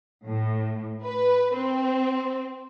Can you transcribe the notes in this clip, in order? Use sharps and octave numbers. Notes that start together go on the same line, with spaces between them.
A2
B4
C4